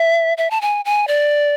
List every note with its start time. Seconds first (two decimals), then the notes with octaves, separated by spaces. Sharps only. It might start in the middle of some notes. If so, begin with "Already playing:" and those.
Already playing: E5
0.38 E5
0.51 A5
0.61 G#5
0.85 G#5
1.08 D5